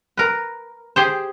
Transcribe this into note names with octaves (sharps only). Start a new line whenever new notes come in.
A#4 B4
G4 G#4 C5